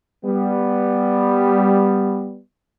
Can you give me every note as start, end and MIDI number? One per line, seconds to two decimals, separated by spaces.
0.24 2.40 55
0.24 2.40 59